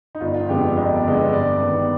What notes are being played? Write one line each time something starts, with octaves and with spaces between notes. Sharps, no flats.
D#4
G1 F4
F4
F2 D3 G#3 B3 G4
G1 D#5
D5
F2 D3 G#3 B3
G2 D5
D#3 B3